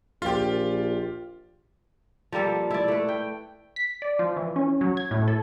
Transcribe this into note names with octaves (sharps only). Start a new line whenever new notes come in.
A#1 F4 G4
F3 G3 A#3 A4
E4 D5
A3 B4
G5
B6
D5
F3
E3
C#4
F#3
G#6
A2
A4